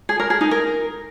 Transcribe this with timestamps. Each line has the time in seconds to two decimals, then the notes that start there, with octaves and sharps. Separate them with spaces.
0.09 G#4
0.20 A#4
0.30 G#4
0.41 D#4
0.51 A#4